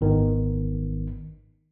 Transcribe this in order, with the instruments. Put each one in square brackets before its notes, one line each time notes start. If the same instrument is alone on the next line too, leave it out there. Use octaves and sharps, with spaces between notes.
[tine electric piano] G#1 D#3 B3